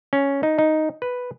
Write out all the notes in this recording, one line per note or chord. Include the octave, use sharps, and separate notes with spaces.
C#4
D#4
D#4
B4